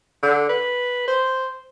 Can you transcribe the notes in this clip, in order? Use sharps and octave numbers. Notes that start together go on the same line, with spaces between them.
D3
B4
C5